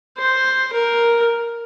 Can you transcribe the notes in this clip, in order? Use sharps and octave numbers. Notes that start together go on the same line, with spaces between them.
C5
A#4